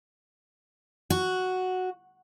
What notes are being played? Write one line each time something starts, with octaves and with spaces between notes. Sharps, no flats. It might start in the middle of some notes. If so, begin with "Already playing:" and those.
F#4